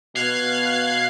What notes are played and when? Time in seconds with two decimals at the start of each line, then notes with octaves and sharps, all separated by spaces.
0.16 B2 F5 F#6 G#6 C7